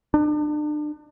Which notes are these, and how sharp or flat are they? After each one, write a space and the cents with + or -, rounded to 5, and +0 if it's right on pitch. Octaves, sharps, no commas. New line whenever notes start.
D4 +35